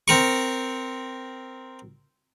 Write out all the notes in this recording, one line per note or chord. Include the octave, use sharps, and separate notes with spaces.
C4 A#4 C#6